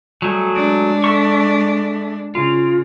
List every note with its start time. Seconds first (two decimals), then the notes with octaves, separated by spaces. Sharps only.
0.22 F#3 G3 A3 G#4
0.56 G#3 D4
1.04 A4 E5 C#6
2.35 C#3 F4